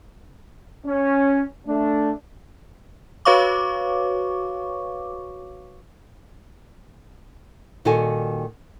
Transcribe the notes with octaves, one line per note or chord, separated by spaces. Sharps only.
C#4
A3 D4
F#4 B4 C#5 F5 C#6 D6
A#2 D#3 G3 F#4 A4 G#5